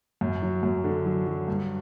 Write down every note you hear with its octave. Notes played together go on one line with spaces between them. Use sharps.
F#2
F#3
F#2
D3
F#3
F#3
G2